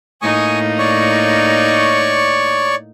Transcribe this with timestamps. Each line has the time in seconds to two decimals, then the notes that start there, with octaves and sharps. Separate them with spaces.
0.22 A2 A#3 D#4 G#5 C#6 D#6
0.79 C#5 D5 C#6